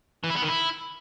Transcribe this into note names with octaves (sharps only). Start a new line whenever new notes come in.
E3
E4
B3
D#3
E4